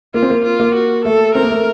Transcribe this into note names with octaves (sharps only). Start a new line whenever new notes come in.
A#3 F4
C4
A#3
F4
A#3
F#4
A3 A4
C4 A#4
A#3
A3